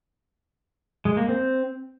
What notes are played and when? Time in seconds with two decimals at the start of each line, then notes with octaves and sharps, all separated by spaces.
1.05 G#3
1.17 A#3
1.29 C4